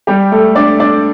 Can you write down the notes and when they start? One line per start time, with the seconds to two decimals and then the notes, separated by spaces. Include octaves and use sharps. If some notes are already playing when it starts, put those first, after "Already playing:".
0.07 G3 G4
0.32 A3 A4
0.55 D4 D5
0.80 D4 D5